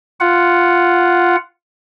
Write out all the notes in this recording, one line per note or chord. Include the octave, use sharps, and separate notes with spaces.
F4 F#5